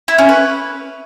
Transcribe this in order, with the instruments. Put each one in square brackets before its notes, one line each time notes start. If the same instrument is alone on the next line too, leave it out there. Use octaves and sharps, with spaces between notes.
[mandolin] E4
C#4
B4